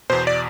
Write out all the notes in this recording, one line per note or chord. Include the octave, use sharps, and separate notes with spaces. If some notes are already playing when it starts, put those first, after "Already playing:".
E2 B2 C5
D5